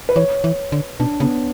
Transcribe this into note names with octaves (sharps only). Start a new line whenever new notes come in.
B4
E3 C#5
E3
D3
B2 D4
C#3 B3